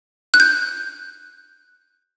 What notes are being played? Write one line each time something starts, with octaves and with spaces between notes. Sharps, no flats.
F#6
G6